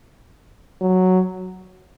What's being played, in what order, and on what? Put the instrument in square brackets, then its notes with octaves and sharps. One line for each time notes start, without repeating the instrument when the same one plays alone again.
[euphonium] F#3